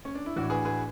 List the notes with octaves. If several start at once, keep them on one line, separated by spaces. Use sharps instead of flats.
C#4
D4
E4
A2 E3 D4 F#4
G#4 B4
G#4 B4